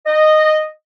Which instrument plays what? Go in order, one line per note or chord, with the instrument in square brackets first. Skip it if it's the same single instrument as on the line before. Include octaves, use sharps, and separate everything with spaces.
[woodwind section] D#5